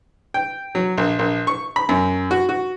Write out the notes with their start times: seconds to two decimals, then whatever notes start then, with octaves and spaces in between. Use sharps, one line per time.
0.34 G5
0.75 F#3
0.98 A#1
1.19 A#1
1.47 C#6
1.76 B5
1.89 F#2
2.31 F#4
2.49 F#4